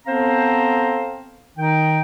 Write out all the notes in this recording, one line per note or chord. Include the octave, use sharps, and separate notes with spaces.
B3 C4 A4 C5 F5 A#5
D#3 D#4 G5